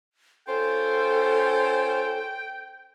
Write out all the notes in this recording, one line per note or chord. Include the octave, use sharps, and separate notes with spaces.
C#4 F4 A4 C5 G5